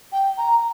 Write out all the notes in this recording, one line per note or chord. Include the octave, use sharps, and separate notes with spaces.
G5
A#5